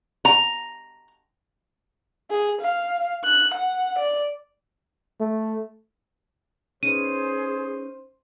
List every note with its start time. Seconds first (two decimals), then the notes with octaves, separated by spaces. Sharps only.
0.25 A#5
2.31 G#4
2.61 F5
3.24 F#6
3.54 F#5
3.98 D5
5.20 A3
6.83 C#4 D#4 G#4 B4 C5 D#7